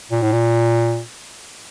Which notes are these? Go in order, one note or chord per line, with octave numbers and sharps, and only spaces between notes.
A#2
A2
A#2